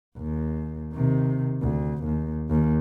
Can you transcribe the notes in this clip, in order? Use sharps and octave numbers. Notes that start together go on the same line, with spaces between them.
D#2
C3 D#3
D2
D#2
D#2